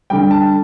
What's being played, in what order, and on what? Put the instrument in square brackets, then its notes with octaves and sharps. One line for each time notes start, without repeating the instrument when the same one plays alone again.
[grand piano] D3 G3 G5
A5